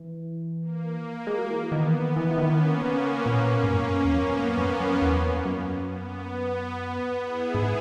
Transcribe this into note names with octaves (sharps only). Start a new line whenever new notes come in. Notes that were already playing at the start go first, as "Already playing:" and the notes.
Already playing: E3
A#3
G#3
F#3
E3 B3
D#3
E3
D#3
E3
E3
D#3 A#3 C#4
C#3
A#2 A#3 C#4
G#2
F#2
E2
F#2 B3
A#2
G#2
F#2
F#2
E2
F#2
B3
B3
E4 G#4
G#2